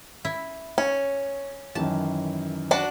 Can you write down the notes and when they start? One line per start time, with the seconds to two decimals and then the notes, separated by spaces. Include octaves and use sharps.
0.25 E4
0.78 C#4 C#5
1.75 F#2 D#3 E3 A5
2.71 D4 F#4 A5